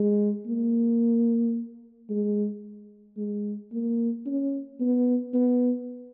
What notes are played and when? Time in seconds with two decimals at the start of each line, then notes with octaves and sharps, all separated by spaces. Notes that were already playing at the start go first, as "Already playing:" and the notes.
Already playing: G#3
0.47 A#3
2.10 G#3
3.17 G#3
3.72 A#3
4.26 C#4
4.80 B3
5.34 B3